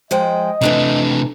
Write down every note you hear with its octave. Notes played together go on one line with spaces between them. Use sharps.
F3 G#3 D#5 G5
C3 E3 A3 D4 A#5